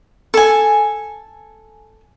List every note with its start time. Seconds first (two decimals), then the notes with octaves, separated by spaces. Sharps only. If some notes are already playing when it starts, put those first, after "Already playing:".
0.34 A4 G#5